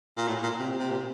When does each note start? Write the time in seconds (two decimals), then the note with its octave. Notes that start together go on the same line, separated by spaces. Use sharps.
0.17 A#2
0.28 A2
0.43 A#2
0.59 C3
0.79 C3
0.91 A#2